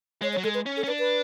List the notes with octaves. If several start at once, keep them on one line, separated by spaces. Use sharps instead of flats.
G#3 C#5
C#5
F#3
G#3 A4
B4
C#4
A4
C#4
D4 B4
B4